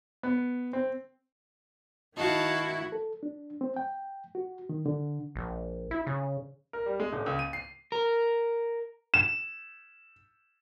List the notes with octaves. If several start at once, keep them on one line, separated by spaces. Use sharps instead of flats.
B3
C4
D#3 D#4 E4 F#4 F5 A5
A4
D4
C4
G5
F#4
D#3
D3
A#1
E4
C#3
A#4
G3
G#3
D#1
C#2
D#7
C7
A#4
E7